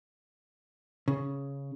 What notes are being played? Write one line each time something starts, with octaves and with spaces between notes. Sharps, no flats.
C#3